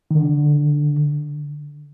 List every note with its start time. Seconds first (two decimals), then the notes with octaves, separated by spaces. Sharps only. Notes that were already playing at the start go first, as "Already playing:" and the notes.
0.11 D#3
0.15 D3